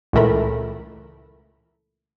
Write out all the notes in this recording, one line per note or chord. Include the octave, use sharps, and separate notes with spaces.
C#2 A#2 E3 A3 A#4 B5